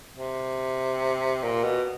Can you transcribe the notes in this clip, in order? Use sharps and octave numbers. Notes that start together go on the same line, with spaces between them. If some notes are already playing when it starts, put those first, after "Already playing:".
C3
A#2
B2